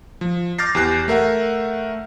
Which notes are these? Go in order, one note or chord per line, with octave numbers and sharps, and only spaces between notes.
F3
D6 F6 G6 A6 A#6 C7
E2 G4 F#6 C7
A3 A#4 E5 F#5